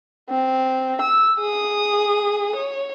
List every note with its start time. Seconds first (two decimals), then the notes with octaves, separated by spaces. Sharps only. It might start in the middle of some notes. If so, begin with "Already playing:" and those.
0.29 C4
1.01 E6
1.39 G#4 D#6
2.56 C#5